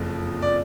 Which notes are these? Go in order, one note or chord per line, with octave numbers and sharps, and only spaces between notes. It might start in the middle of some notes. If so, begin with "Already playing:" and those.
Already playing: F#1 F2 F3
D5